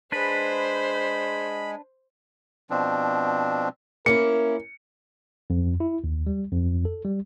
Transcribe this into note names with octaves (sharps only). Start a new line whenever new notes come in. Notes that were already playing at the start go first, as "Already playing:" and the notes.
G#3 D4 B4 C5 B5
B2 F3 C4 D4
A#3 C#4 E4 A#4 C#7
F2
E4
D#2
G3
F2
A4
G3